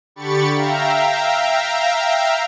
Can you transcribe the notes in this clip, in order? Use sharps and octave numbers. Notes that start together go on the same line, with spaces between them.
D3 G4 B5 C#6 A6 C#7
E5 F5 G5 A#5